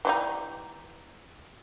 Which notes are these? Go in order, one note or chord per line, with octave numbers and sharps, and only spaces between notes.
E3 G3 D#4